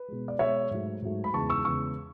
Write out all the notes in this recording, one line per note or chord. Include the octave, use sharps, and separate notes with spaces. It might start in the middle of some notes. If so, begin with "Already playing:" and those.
Already playing: B4
B2 G#3
D5
B2 G#3 C#5 E5
G#2 F#3 A3
G#2 F#3 A3
B5
E2 C#3 E3 G#3 A5 C#6
C#6 E6
E2 C#3 E3 G#3 C#6 E6